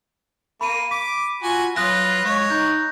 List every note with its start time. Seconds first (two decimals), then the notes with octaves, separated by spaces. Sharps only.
0.61 A#3 B5 D#7
0.91 D6 B6
1.43 F4 F#4 G#5
1.76 F#3 F4 B4 D#6 F#6 A#6
2.25 G#3 C#5
2.50 D#4 G6